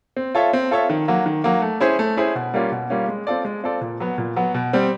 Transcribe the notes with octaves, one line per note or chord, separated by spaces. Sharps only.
C4
F4 A4 C#5 E5
C4
F4 A4 C#5 E5
D#3
F#3 A#3
D#3
F#3 A#3
A3
C#4 E4 G#4 C5
A3
C#4 E4 G#4 C5
B2
G3 A#3 C#4 F4
B2
G3 A#3 C#4 F4
G#3
C4 F4 A4 D5
G#3
C4 F4 A4 D5
A#2
F#3 B3
A#2
F#3 B3
B2
G3 C4